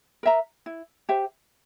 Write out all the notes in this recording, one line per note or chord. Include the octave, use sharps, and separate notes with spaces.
A#4 E5 A#5
E4
G4 C5 E5